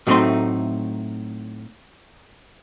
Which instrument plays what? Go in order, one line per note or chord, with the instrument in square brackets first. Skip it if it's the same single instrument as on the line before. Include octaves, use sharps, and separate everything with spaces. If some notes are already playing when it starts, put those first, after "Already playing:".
[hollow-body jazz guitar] A2 F#3 A3 C4 D#4 C6